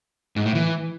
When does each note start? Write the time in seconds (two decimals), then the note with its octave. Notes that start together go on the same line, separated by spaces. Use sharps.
0.36 G#2
0.46 A2
0.55 E3